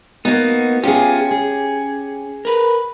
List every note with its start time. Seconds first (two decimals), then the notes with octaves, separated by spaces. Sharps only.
0.25 A#3 B3 D#4 F#4
0.83 C#4 F4 G4 G#4
1.31 G#4
2.45 A#4 B4